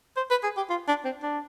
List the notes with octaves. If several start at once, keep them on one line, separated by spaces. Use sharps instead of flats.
C5
B4
G#4
G4
F4
D4
C4
D4